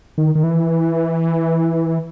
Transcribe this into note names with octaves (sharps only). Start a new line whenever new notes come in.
D#3
D#3
E3